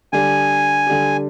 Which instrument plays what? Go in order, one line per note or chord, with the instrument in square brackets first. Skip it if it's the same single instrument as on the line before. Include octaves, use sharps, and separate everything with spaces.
[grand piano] D3 G3 D4 G4 [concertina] G#5
[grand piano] D3 G3 D4 G4